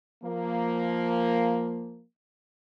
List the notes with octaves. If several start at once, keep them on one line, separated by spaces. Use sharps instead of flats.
F3 A#3